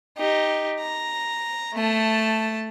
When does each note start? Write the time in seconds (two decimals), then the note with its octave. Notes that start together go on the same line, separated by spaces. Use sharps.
0.18 D#4 G4
0.81 A#5
1.74 A3 A5